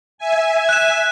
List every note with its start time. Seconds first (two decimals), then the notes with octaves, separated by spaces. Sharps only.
0.18 E5 G#5
0.69 F#6 E7